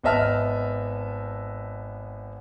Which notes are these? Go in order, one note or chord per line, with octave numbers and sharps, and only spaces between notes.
G#1 B3 D#5 E5 A5 F6